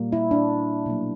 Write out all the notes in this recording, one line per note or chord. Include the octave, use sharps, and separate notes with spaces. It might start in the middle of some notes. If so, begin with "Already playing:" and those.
Already playing: A#2 G3 A#3
E4
D4
B2 F#3 A#3